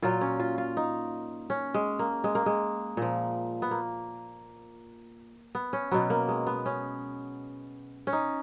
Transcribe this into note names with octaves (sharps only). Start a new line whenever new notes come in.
A#2 F#3 F4
C#4
F4
F4
D#4
C#4
G#3
A#3
G#3
A#3
G#3
A#2 F3
B3
A#3
B3
C#4
B2 F#3 B3
A#3
G#3
B3
C#4
C#4
D#4